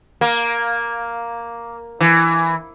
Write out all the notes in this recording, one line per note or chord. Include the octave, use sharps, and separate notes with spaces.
A#3
E3